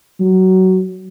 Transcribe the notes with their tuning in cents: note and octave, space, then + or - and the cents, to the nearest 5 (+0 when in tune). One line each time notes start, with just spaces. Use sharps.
F#3 +15